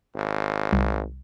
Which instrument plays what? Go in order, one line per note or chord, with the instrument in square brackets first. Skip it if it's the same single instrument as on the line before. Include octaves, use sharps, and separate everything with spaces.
[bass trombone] G#1
[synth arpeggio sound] C2